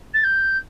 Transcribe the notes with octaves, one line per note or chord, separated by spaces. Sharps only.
A6
G6